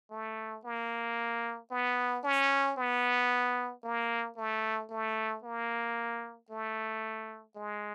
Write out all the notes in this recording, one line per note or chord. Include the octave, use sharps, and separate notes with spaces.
A3
A#3
B3
C#4
B3
A#3
A3
A3
A#3
A3
G#3